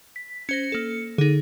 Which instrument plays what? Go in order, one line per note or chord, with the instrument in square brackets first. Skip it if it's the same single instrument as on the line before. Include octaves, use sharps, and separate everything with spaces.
[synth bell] B6
[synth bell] C#4 C5 A#6 [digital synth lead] C#7
[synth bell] A#3 A4
[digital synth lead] D3 [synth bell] D#4 G#4